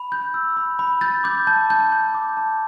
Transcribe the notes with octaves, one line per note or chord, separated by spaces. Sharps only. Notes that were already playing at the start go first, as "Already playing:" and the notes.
Already playing: B5
G6
E6
B5
B5
G6 A6
D6 G6
A5 G6
A5 G6
G6
D6
A5